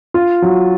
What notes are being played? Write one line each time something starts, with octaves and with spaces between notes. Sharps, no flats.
F4
F#3